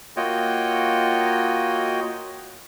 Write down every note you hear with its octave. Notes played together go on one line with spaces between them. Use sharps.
A#3 F4 F#4 C#5 D#5 G5